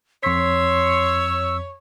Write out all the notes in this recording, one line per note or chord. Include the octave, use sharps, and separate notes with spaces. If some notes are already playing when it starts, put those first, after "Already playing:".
F2 C#5 C6 E6 B6